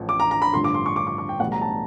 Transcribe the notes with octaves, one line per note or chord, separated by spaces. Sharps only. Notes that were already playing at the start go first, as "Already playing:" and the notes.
Already playing: A1 A2 F3
D6
A#5
A#5
B5
A1 G2 D3 F3 C6
D6
C6
C#6
D6
D6
C#6
G5
B1 A2 E3 G3 F#5
A#5
A5